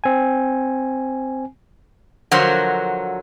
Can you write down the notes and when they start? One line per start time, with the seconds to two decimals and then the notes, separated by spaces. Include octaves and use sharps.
0.04 C4 G#5
2.31 D3 F3 F#3 F#4 A#4 C5